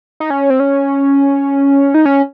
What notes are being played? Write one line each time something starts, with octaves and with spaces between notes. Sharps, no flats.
D#4
C#4
C4
C#4
D#4
C#4